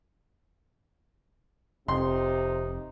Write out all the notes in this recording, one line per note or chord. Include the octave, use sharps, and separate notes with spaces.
F1 F2 C3 D#4 C6